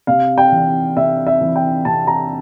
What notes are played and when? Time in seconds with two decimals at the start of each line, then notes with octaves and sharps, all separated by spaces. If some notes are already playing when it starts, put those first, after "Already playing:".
0.07 C3 F5
0.38 G5
0.52 E3
0.96 C3 E5
1.27 E5
1.41 E3
1.56 G5
1.85 C3 A5
2.07 A#5